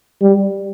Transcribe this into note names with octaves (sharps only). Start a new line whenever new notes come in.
G3